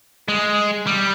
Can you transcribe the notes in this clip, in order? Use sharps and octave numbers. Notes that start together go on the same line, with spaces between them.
G#3
G3